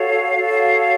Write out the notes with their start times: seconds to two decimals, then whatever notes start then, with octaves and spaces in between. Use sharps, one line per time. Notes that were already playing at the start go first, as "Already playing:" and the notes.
Already playing: F#4 A4 C#5 F5
0.36 F#4 A4 C#5